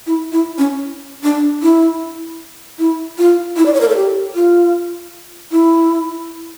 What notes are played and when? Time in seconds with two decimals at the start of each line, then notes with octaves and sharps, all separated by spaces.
0.07 E4
0.32 E4
0.58 C#4
1.23 D4
1.62 E4
2.79 E4
3.18 F4
3.57 E4
3.66 D5
3.74 C#5
3.81 A#4
3.88 A4
3.96 G4
4.35 F4
5.52 E4